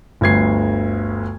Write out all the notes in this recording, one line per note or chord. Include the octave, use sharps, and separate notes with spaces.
G1 D2 G#6 C7